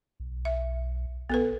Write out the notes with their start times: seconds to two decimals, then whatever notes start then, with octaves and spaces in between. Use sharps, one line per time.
0.20 B1
0.45 E5
1.30 A#1 B3 A4 B4